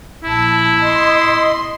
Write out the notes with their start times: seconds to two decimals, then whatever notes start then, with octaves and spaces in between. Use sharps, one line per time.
0.24 A#1 E4 A5
0.80 D#5 C6